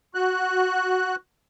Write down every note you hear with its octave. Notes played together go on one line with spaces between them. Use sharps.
F#4 F#6